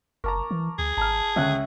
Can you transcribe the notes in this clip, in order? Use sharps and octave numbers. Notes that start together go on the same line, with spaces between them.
F#1 A#4 A5 A#5 C#6 D6
E3
D2 G#4
G#1 A5 A#5 F6
C#2 D3 C#4 E5 F#6